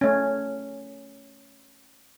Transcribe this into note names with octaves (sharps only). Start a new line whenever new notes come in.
A3 C#4